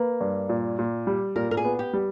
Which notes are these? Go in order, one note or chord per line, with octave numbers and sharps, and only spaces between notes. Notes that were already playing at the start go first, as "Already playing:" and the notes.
Already playing: A#3 B4
G2
A#2
A#2
G3
A#2 A#4
A#4
G#4
B3
G4
G3